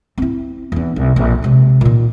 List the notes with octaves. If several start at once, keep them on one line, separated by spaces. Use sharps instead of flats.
C4 E4
E2 D#4
C2
A#1 F2
C3 G#3
A#2 D#3